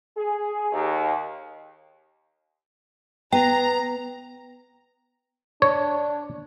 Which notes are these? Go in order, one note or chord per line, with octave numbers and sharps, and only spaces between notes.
G#4
D#2
B3 G5 A#5
D4 C#5